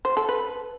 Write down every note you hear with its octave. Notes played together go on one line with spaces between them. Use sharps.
C5
A4
B4